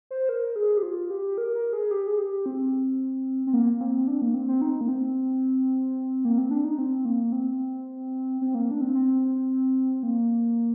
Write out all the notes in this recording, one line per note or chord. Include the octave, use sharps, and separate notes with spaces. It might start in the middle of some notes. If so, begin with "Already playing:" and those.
C5
A#4
G#4
G4
F4
G4
A#4
A#4
G#4
G4
G#4
G4
C4
C4
A#3
C4
D4
A#3
C4
C4
D#4
A#3
C4
A#3
C4
D4
D#4
C4
A#3
C4
C4
A#3
D4
C4
C4
A#3